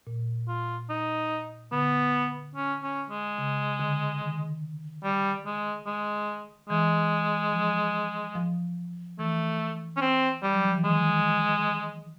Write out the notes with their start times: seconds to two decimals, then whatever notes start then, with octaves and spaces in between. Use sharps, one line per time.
0.07 A#2
0.48 F4
0.90 D#4
1.72 D3 B3
2.55 C#4
2.83 C#4
3.10 G#3
3.38 C#3
3.80 D3
4.22 D#3
5.04 G3
5.46 G#3
5.87 G#3
6.69 E3 G#3
7.53 F3
8.35 F3
9.19 E3 A3
9.97 C#4
10.01 C4
10.43 G3
10.54 F#3
10.65 F3
10.75 E3
10.84 D#3 G#3